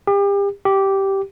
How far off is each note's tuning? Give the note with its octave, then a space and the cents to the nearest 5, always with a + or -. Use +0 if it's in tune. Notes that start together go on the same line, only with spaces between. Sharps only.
G4 +35
G4 -10